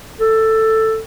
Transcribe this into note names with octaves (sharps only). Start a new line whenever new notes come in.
A4